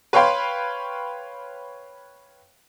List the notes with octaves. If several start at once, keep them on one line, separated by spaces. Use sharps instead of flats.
B4 C#5 F5 G5 B5 C6